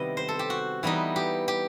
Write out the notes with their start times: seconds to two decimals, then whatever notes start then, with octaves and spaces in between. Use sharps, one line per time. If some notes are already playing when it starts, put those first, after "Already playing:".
Already playing: C3 D#3 G3 B3 E4 D#5
0.17 C5
0.28 A4
0.39 G4
0.50 F#4
0.83 E3 G3 B3 D#4
1.16 G4
1.48 G4